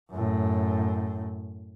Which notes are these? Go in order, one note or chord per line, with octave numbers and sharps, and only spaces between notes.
F#2 A2